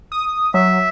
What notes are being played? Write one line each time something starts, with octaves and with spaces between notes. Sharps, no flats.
D#6
F#3 E5